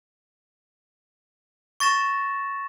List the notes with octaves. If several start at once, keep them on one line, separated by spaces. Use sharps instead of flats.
C#6 A6 A#6 E7